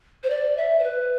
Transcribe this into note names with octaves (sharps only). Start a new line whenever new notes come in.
C5
D5
E5
C5
B4